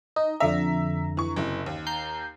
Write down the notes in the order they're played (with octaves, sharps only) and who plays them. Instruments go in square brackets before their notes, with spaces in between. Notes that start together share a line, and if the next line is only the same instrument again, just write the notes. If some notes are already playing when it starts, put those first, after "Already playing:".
[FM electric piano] D#4 [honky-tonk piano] D#5
[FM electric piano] F2 D3 A#5 [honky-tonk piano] E5
[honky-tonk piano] E3 C#6
F#1 C3 E4
D#2
[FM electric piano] A#5 G6 C7